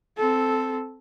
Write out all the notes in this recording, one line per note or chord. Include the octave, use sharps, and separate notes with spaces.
C4 A4